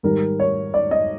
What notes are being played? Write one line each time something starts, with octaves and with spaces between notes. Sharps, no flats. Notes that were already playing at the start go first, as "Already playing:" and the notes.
G#2 D#3 G3 A#4
C#5
D5
D#5